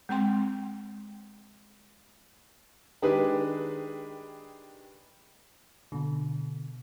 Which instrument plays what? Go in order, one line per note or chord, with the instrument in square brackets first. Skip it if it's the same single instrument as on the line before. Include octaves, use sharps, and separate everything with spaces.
[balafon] G#3 C4 G5 C6
[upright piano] D#3 G#3 D4 G4 G#4 B4
[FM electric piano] B2 D3